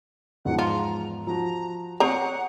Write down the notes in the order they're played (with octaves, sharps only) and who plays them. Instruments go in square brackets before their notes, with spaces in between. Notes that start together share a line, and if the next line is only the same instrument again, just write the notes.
[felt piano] E2 G#2 F3 [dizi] F#5
[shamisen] F4 [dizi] A#5
[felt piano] F3 F#4 [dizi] A#5
[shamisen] C4 C#5 A#5 [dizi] F#5 [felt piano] C#6 D#6 C7